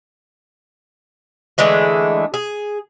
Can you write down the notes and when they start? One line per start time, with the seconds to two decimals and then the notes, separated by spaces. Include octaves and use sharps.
1.58 D3 E3 G#3 A3
2.34 G#4